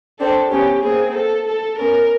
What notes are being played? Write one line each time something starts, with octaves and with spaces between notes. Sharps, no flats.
C4 D4 A4
B3 C#4 G4
A#3 C4 G#4
A4
A4
B3 C#4 A#4